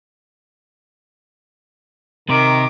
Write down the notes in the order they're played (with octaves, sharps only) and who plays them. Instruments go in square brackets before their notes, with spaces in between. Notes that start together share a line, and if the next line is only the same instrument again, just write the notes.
[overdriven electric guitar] C3 [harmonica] D#3 A#4 [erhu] D6